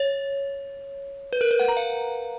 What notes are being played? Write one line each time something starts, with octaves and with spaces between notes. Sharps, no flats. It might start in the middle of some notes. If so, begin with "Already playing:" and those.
Already playing: C#5
B4
A#4
B4
F#5
A#5
F5